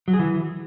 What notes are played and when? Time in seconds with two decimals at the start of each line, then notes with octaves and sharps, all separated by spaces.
0.08 F#3
0.14 G#4
0.19 E3